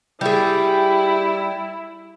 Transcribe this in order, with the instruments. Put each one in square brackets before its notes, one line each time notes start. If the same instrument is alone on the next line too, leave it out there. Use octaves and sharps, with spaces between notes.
[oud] G3 G#4 [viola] E4